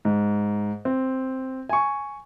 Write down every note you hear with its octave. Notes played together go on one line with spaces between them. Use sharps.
G#2
C4
G#5 C#6